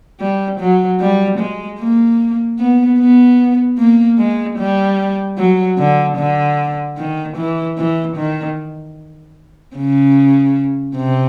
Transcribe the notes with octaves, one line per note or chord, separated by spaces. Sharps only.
G3
F#3
G3
G#3
A#3
B3
B3
A#3
G#3
G3
F#3
D3
D3
D#3
E3
E3
D#3
C#3
C3